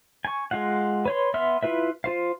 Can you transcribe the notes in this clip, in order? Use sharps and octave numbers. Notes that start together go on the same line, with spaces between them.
G#5 C#6
G#3 F4 F5 F#5
B4 C#5 C6
B3 E5 C6 F6
E4 F4 B4 E5
F4 C5 F5